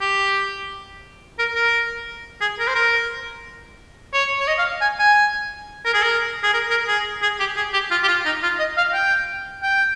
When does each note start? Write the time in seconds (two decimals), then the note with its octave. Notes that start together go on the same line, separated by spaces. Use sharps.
0.01 G4
1.39 A#4
1.55 A#4
2.41 G#4
2.59 A#4
2.68 C5
2.75 A#4
4.13 C#5
4.40 C#5
4.47 D#5
4.59 F5
4.81 G#5
4.99 G#5
5.85 A#4
5.94 G#4
6.03 A#4
6.43 G#4
6.54 A#4
6.70 A#4
6.88 G#4
7.22 G#4
7.40 G4
7.56 G#4
7.73 G4
7.91 F4
8.03 G4
8.08 F4
8.25 D#4
8.43 F4
8.59 D#5
8.77 F5
8.93 G5
9.63 G5